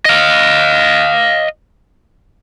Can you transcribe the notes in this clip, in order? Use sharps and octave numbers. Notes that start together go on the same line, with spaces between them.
D#5 F5